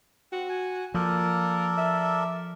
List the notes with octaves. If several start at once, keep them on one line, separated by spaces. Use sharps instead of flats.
C4 F#4
G#5
F3 A#3 A4 A#4 D5
E5